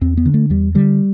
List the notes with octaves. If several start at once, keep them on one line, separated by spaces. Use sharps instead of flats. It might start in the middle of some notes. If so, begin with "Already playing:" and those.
E2 C4
B3
D3
A3
E2 G3
D3 G3